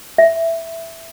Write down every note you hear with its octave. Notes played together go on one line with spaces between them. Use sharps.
E5